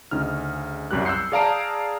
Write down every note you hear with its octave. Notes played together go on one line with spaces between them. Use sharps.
D2 C#3 D#4 F6
C2 F#2 G3 G4 F#6
E6 F#6 G6 C7 C#7
G#4 D5 F5 A5 A#5 D7